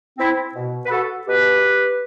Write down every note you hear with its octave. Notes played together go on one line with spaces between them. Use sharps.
C4 E4
B2
B4
F#4 A4
B2 G4 B4